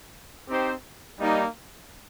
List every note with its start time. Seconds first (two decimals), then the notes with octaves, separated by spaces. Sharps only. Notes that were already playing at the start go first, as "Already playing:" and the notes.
0.48 C4 D#4 G4 C5
1.19 G3 A#3 D#4